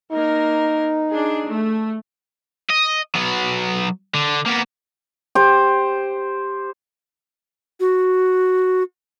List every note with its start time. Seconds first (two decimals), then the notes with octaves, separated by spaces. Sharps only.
0.12 A#3 D#4 A#4
1.09 D4 G#4
1.48 A3
2.70 D#5
3.15 F#3 B3
4.14 D3
4.46 A#3 B3
5.35 G4 C5
7.80 F#4